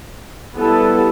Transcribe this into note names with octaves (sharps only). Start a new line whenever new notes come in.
G3 B3 E4 A4